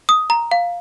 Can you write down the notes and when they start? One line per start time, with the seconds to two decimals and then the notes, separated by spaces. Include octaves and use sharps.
0.09 D#6
0.30 A#5
0.51 F5